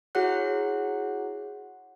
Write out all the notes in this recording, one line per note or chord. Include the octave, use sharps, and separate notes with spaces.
E4 F#4 G#4 C#5 F#5 F#6